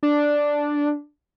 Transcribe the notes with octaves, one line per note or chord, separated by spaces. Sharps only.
D4